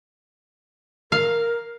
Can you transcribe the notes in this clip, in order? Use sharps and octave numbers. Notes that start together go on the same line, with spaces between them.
A#4 F5